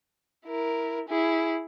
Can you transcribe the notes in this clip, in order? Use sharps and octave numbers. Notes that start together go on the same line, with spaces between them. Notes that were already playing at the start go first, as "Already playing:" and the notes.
E4 A#4
E4 G#4